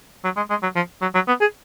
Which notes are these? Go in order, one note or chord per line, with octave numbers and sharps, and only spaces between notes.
F#3
G#3
G#3
F#3
F3
F#3
F#3
B3
G#4